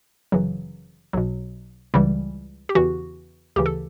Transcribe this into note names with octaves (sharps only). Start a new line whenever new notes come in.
G1 F#2 C#3 E3 F#3
B1 B2 F#3
C#2 C#3 E3 G3
G4
E2 C#3 E3 F#4
D2 C#3 E3 G4
A4